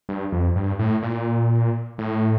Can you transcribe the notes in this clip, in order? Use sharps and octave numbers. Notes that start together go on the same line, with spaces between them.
G2
F2
G2
A2
A#2
A2